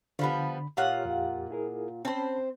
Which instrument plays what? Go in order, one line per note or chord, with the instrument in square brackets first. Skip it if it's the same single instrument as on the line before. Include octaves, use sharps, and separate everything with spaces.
[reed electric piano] D3 B5 [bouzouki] F3 G3 B3
[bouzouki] A#2 F4 F#5 [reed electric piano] G4 C#5 F5
[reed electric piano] F2 G4
E4 G#4 A#4
[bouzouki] C4 C5 [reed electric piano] C#4 A5 B5